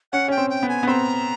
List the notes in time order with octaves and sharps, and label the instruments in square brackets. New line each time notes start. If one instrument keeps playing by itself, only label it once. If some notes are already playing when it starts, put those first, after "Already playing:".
[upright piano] C#4 [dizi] F#5
[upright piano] C#4 [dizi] G5
[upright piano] C4
[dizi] G5
[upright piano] B3
[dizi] G#5
[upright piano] B3
[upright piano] C4 [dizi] B5
[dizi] A#5